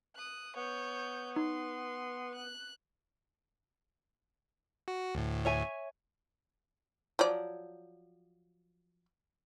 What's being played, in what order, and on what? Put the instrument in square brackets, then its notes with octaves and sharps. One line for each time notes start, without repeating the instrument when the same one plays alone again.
[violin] D#6 F#6
[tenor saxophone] B3 [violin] C#5 G6
[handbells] D#4 [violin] C6
[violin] F#6
[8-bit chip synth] F#4
D2 A2
[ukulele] C#5 E5 G#5
[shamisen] F3 F#3 D5